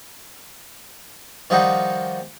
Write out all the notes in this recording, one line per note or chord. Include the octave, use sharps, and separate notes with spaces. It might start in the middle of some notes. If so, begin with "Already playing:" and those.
D#3 F3 G3 D#4 F#4